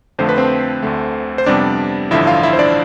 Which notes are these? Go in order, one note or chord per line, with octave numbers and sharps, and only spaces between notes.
F2 D3 F3 A3 C5
B4
C4 C5
D2 D3 A3
C5
F2 C3 G3 B3 D4 D5
A1 G2 D3 F3 E4 E5
F4 F5
E4 E5
C5
D4 D5